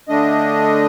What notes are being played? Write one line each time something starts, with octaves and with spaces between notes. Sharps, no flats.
D3 A3 D4 D#5